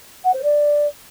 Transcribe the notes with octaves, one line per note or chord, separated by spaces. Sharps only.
F#5
C5
D5